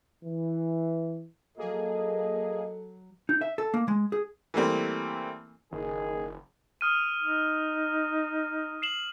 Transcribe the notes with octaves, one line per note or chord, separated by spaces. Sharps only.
E3
F#3 A#3 G#4 A4 D#5
D#4
E5
A4
A#3
G#3
G#4
E3 G3 A3 A#3 C4
F#1 D#3 G#4
D#6 F6 D#7
D#4
C7 E7 F#7